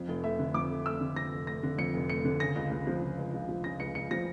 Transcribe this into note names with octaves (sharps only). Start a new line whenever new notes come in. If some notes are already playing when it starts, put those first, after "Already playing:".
Already playing: F2
F1
A3 E5
D3
F2 D6
F1
A3 E6
D3
F2 A#6
F1
A3 A#6
D3
F2 C#7
F1
A3 C#7
D3
C#3 A#6
C#2
C#2
F3
C#3
C#2
C#2
F3
C#3 A#6
C#2 C#7
C#2 C#7
F3 A#6